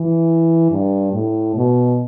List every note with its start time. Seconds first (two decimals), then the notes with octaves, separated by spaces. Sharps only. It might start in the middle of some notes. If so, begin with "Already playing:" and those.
Already playing: E3
0.71 G2
1.13 A2
1.56 B2